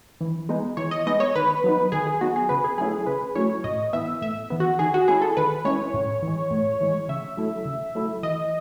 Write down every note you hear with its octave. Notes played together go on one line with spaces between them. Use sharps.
E3
G#3 B3 D#4
E3 C#5
D#5
G#3 B3 D#4 D#5
C#5
D#3 B4
F#3 B3 D#4
D#3 G#4
G#4
F#3 B3 D#4 F#4
G#4
C#3 B4
G#4
F#3 A3 C#4 E4 G#4
G#4
C#3 B4
F#3 A3 C#4 E4 C#5
A2 D#5
E3 B3 E5
A2 E5
E3 B3
F#4
D#3 G#4
F#4
G#3 C#4 E4 G#4
A4
D#3 B4
G#3 C#4 E4 C#5
A2
E3
G#3
A2
E3 G#3
C#3 E5
F#3 A3 E4
C#3
F#3 A3 E4
E3 D#5